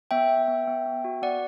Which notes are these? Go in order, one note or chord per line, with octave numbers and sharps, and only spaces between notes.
B3 E5 G5
B3
B3
B3
B3
F#4
B3 D5 F#5